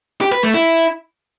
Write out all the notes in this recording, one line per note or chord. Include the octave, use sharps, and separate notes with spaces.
G4
B4
A3
E4